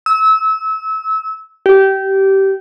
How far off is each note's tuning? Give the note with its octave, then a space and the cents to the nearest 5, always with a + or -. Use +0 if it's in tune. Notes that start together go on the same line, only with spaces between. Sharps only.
E6 -30
G4 -20